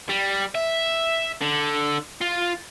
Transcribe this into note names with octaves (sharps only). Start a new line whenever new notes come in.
G3
E5
D3
F4